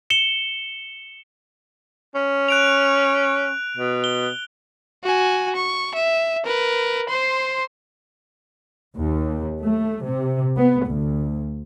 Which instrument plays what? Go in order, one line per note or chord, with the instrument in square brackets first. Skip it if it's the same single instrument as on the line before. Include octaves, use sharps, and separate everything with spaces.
[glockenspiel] C#7 E7 G7
[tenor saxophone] C#4
[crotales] F#6 D7 F7
[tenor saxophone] B2
[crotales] G7
[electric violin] F#4 G#5
C#6
E5
A#4 B4
C5 C6
[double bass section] D#2
A3
C3
B3
D2